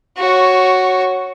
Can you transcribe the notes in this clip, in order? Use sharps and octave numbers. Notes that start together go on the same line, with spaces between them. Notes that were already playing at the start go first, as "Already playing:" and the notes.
F#4 C#5